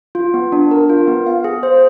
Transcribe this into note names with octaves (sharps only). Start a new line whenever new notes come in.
F4
B3
D4
A#4
F4
B3
F5
G#4
C5